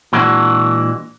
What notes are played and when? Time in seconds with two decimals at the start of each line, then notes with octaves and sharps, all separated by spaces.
0.13 A#2 E3 G#3 D4 F#4